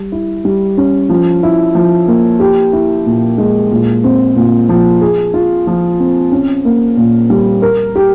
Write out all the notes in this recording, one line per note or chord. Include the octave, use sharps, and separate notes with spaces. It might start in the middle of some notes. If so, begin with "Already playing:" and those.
Already playing: G3
E4
G3
C#4
F3
E4
F3
A#3
G4
E4
A#2
G#3
A#2
C4
A#2
F3
G#4
F4
F3
C4
C#4
A#3
A#2
G3
A#4
G4